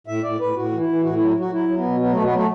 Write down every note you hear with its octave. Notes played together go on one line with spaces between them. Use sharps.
A2 E5
A2 D5
A2 B4
A2 F#4
E3
E4
E3
A2 F#4
F#3 E4
F#3 F#4
F#3 E4
F#3
B3
B2
F#3 B3
B2 A3
B3
F#3 A3